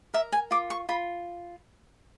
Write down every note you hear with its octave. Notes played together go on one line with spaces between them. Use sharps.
A#4 E5
G#5
F4 D6
C#6
F4 B5